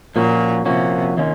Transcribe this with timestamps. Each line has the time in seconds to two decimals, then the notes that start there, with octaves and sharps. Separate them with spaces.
0.16 A#2 F3 A#3 C#4 F#4
0.65 C3 F3 A#3 C#4 F#4
1.17 D#3 A#3 C#4 F4